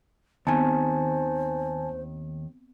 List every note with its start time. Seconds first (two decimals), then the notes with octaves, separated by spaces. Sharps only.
0.47 D#2 D#3 B3 C4 C5 G#5 A5